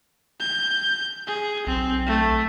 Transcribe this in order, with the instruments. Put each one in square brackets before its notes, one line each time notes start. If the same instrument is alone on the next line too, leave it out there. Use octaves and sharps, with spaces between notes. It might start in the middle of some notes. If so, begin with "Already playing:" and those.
[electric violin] G6
G#4
[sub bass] B1 [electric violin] C4
[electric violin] A3